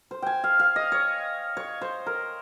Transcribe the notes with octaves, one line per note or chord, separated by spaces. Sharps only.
C5
G5 G#5
F5
F5
D#5
C#5
C#5
C5
A#4